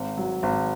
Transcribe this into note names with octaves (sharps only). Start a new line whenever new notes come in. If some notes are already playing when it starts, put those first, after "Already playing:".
Already playing: G#1
F#3
G#1